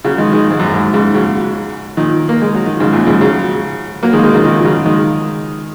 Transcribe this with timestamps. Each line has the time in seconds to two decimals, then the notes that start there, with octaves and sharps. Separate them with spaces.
0.05 C#3 F#3
0.18 D#3 G#3
0.33 D#3 G#3
0.50 G#2
0.59 F#2
0.74 G#2
0.94 G#2 C#3
1.14 C#3 F#3
1.97 A#2 D#3
2.29 A#3
2.42 G#3
2.55 F#3
2.66 D#3
2.80 G#2 C#3
2.93 F#2 A#2
3.07 G#2 C#3
3.21 C#3 F#3
4.03 F#3 A#3
4.13 D#3 G#3
4.19 A#3
4.23 D#3 G#3
4.34 C#3 F#3
4.44 A#2 D#3
4.65 C#3 F#3
4.86 D#3 G#3